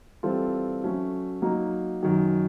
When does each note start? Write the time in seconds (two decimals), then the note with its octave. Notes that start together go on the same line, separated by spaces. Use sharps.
0.23 E3 G3 C4 F4 A4
0.83 F#3 A3 C#4
1.42 F#3 A#3 D#4
2.03 F#2 D#3 F#3